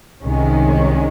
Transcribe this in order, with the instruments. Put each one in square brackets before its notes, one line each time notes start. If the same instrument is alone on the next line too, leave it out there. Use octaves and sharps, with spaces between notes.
[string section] C2 C3 D#3 G#3 C#4